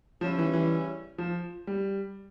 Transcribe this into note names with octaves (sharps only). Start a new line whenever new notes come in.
C#3 F3 G3 C#4 E4
E3
E3
F3
G3